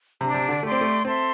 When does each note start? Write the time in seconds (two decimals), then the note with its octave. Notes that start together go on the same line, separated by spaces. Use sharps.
0.21 C3 D4 G4 D5
0.34 C3
0.49 D3
0.62 A3 G4 D5 C6
0.72 C4
0.81 A3
1.05 C4 A4 E5 C6